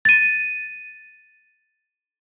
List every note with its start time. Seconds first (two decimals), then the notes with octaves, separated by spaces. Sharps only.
0.05 A6 D#7